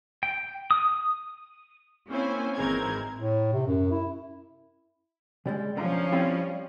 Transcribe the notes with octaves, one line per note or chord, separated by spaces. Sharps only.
G5
D#6
A#3 C4 C#4 E4 C5 G#5
G#1 E3 G#3 C4 A#4 G#6
A2
C3
F#2
E4
C#3 G3 G#3
B1 D3 F3 C#4 A#5
G3 C4 E4